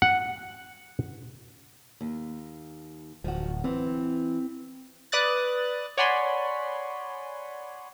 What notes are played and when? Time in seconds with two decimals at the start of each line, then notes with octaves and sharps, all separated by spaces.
0.02 F#5
2.01 D#2
3.24 D1 F3 F#4
3.64 E3 C4
5.12 B4 D5 D#6 F#6 A6
5.98 C#5 D5 F#5 G#5 B5 C6